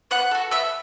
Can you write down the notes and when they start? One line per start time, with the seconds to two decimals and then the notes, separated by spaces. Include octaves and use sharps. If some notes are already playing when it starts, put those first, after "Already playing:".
0.11 B3 F#5 F#6
0.31 F#4 A4
0.51 B3 E5 E6